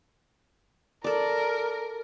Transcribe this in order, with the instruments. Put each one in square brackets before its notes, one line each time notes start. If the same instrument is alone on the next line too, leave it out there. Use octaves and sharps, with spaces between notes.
[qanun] A4 D5 [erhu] A#4